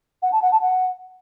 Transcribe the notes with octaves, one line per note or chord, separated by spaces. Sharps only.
F#5
A5
F#5
A5
F#5